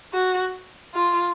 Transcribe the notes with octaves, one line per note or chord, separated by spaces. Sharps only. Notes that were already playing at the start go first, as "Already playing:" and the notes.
F#4
F4